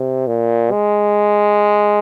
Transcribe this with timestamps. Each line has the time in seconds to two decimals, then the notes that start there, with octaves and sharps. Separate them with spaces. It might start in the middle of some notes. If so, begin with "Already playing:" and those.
Already playing: C3
0.27 A#2
0.71 G#3